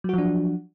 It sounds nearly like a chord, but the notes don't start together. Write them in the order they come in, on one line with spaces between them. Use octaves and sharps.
F#3 F#4 F3 D4